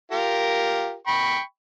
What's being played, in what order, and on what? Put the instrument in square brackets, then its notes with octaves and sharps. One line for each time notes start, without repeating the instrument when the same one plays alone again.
[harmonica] F4 G4 A#4
G5 B5 C#6